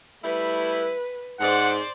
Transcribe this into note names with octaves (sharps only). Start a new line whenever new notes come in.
G3 A3 E4 B4
G#2 C5 D5 F#5